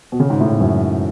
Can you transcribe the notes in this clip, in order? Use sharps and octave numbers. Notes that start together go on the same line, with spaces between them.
B2
C#3
G#2
A2
G#2
F#2